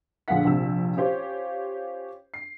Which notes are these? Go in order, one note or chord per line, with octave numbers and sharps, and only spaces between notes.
A#1 D3 G#4 F5 F#5 B6
A#1 C3 E6
C#4 F4 G4 C5 C#5
C7